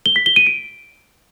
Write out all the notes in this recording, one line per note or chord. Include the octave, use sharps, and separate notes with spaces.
G7
B6
G7
D#7
D7